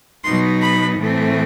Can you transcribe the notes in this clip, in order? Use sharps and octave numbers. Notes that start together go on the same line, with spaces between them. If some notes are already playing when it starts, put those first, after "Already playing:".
B2 F#3 B3 D#4 C6
B5
A2 E3 A3 C4